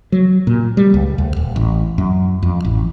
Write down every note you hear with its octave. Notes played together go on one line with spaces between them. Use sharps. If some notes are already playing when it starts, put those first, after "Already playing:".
F#3
A#2
G3
C#2
D2
D#1
A1
F#2
F2
A1